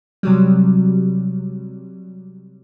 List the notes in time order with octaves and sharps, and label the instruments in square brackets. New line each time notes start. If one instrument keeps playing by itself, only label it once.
[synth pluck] C3 F#3 G3